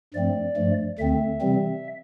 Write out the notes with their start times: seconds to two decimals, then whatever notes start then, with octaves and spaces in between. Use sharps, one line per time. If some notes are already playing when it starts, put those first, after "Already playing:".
0.14 G2 F3 A3 C4 D5
0.56 G2 F3 A3
0.99 D2 D3 A3 C4 E5
1.41 C3 E3 G3 C4